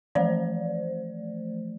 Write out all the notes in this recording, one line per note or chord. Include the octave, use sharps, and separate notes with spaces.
E3 F3 A3 C5 D5